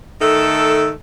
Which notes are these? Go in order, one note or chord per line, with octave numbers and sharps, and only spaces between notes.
D#3 A3 A4